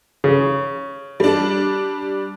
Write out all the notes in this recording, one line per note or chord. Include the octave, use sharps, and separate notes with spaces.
C#3
G3 D4